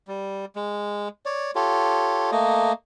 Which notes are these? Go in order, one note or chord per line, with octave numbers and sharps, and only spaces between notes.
G3
G#3
C#5 D5
F4 G4 A4 C#5
A3 A#3 D#5